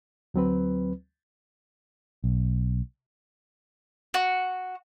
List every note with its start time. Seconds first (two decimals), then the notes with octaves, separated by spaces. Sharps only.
0.34 D2 F#3 C4 B4
2.24 B1
4.14 F#4